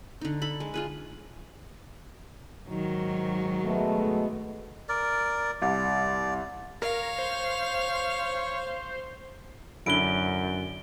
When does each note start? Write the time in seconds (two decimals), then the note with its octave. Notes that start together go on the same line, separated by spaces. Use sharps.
0.21 D3 D#4
0.42 A4 B5
0.60 G#3
0.74 F4 G#4 B4
2.68 G#2 D#3 F#3
3.66 B2 G#3 A3
4.89 A#4 D5
5.62 C2 D5
6.82 A#4 C#5 F5
7.19 C5
9.86 F#2 D3 E4 D7 G7